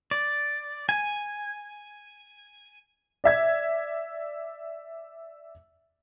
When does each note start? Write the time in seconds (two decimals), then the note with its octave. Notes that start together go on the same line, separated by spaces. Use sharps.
0.11 D5
0.89 G#5
3.24 D5 E5 G#6